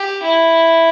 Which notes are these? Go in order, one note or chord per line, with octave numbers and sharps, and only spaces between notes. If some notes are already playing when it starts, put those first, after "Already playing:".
Already playing: G4
E4